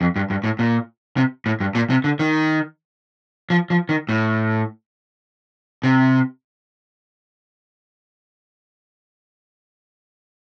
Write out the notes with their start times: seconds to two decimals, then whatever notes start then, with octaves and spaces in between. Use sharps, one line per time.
0.01 F2
0.16 G2
0.30 G2
0.44 A2
0.59 A#2
1.17 C3
1.46 A2
1.60 G2
1.75 A#2
1.90 C3
2.04 D3
2.19 D#3
3.50 F3
3.70 F3
3.89 D#3
4.09 A2
5.83 C3